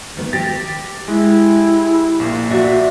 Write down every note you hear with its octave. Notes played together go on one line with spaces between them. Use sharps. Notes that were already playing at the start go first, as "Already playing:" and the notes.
D#3 B3
G4 A6 A#6
G#3 E4
A#1 A#2
F#4 D5 E5